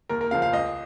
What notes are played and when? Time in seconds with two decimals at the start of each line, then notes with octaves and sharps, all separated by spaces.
0.09 D#2 A#4
0.21 A#4
0.31 C#3 F3 F5
0.42 F5
0.53 C#2 D#5